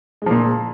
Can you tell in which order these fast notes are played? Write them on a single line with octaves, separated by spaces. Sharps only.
G#3 F3 A#2